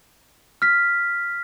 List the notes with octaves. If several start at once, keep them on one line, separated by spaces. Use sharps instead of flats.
F6 B6